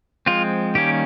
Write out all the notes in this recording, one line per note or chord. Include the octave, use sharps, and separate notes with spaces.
F3 G#3 C4 F4
D#3 G3 A#3 C#4 G4